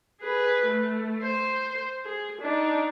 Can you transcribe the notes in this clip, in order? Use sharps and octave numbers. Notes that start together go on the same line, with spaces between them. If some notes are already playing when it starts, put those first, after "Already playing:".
G#4 B4
A3
C5
G#4
D4 D#4